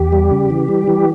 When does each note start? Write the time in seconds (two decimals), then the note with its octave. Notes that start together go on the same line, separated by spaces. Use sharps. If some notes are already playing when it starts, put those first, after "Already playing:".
Already playing: E2 G4
0.12 G3
0.31 C#3
0.50 E3
0.68 G3
0.88 E3